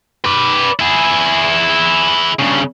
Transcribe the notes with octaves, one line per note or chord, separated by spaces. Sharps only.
B4 D5
E4 G#4
G2 C#3